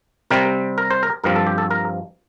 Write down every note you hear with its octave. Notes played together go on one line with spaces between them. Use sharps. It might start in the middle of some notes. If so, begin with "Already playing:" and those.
C3 G3 C4 A#4
A#4
C5
A#4
G2 F3 C4 A#4
A4
G4
A4
A#4